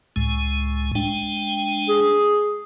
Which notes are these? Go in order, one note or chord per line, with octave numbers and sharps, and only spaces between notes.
C#2 A2 G#3
G#3 D4 G5
G#4